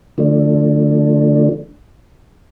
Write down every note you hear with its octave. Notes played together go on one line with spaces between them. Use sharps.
D3 F3 A3 D4